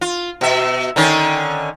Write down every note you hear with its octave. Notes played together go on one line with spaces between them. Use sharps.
F4
B2 E5
D3 D#3 C#4